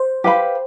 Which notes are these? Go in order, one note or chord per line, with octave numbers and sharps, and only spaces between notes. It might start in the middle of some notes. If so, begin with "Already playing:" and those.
Already playing: C5
G4 B4 F5 B5